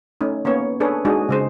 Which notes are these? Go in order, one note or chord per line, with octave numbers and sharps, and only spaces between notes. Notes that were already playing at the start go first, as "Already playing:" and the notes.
A3 C#4 D#4
A#3 B3 C#4 C#5
D4 G#4 A4 B4 C#5
G#3 D4 D#4 F#4 G#4
C#3 G#3 C5